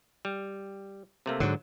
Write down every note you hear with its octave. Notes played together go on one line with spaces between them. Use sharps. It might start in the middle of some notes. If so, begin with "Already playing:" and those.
G3
C3 A3 A#3
G#2 D3 F#3